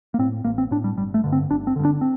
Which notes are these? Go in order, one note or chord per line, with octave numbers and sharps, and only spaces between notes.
A#3
A2 C4
A1 A#3
C4
A2 D4
G3
G1 G3
A3
G2 D3
C4
G1 D4
C4
G2 D3
D4
C4